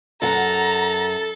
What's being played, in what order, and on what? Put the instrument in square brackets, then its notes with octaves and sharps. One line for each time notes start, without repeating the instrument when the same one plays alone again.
[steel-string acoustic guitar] F#2 F#5 [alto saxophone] A4 [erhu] A#5